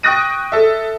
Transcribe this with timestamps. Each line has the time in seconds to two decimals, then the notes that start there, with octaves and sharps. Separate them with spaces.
0.03 G5 C#6 D#6 F#6 A#6 D#7
0.52 A4 E5